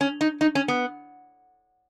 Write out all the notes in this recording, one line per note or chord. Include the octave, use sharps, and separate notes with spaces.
C#4
D#4
D#4
C#4
B3